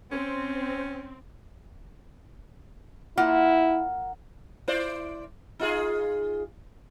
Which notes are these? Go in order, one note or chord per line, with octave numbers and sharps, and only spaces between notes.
C4 C#4
A#3 E4 F4 F#5
E4 C5 D5
D#4 F4 G#4